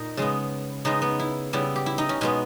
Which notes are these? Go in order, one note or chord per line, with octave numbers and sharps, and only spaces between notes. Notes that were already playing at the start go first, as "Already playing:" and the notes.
Already playing: A#2 D#4
C#3 G#3 B3
C#3 G#3 B3 D#4
B3
E4
C#3 G3 B3 E4
G4
E4
D#4
C#4
B2 G#3 B3 C#4